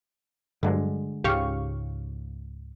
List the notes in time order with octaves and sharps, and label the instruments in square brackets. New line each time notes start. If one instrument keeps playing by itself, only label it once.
[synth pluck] G2 F#3 [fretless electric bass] D3 G#3
[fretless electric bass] C#2 G#2 C#3 [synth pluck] G4 F5 C#6